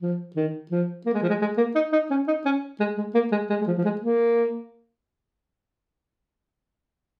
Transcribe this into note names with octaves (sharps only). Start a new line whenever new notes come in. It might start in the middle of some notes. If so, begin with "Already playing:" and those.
F3
D#3
F3
A#3
G#3
F3
G#3
G#3
A#3
D#4
D#4
C#4
D#4
C#4
G#3
G#3
A#3
G#3
G#3
G#3
F3
F3
G#3
A#3